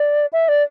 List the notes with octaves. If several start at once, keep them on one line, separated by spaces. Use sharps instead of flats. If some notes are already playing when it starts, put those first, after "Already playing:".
Already playing: D5
E5
D5